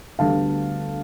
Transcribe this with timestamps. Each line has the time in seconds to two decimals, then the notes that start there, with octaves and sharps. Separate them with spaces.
0.19 D2 D3 G3 B3 F5 A5